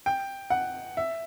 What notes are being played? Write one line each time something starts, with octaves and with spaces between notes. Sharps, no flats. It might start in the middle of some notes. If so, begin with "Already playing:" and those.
G5
F#5
E5